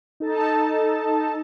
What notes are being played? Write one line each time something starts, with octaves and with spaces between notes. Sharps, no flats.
D#4 A4 A5